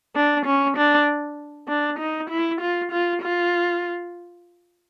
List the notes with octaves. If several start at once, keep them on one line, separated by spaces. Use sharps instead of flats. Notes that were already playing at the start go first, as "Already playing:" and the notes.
D4
C#4
D4
D4
D#4
E4
F4
F4
F4